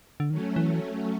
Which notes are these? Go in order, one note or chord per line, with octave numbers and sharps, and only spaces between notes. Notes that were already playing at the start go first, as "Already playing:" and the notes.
D3
D#3 F#3 A3 C#4
E3